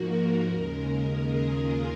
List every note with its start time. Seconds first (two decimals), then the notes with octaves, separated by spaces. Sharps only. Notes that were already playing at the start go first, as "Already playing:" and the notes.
Already playing: G#2 F3 A#3 F#4 A#4
0.49 D#2 C#3 G#3 A#4
1.14 G#4
1.47 F4